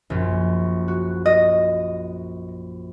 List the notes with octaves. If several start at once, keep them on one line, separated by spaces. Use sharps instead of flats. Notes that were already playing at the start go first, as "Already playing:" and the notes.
A#1 F#2 A#2
F#4
D#5